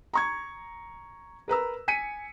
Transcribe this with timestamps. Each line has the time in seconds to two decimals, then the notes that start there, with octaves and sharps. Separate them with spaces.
0.13 A#5 C#6 G#6
1.48 A#4 B4 A#5 E6
1.88 G#5 B6 C#7 D#7